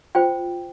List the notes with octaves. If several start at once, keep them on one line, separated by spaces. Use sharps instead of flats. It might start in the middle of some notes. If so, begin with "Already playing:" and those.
F4 C5 G5